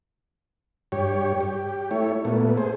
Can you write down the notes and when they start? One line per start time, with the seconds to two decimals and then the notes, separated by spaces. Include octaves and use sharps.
0.92 G2 G4 C#5
1.40 G4
1.91 A3 E4 C#5
2.25 A#2 A3 B3
2.57 G#4 C5